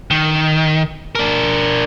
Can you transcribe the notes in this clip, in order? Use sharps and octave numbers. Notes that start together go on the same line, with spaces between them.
D#3
D4 A#4